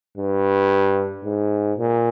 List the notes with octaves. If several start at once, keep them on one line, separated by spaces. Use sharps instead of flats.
G2
G#2
A#2